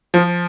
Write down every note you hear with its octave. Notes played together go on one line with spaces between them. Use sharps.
F3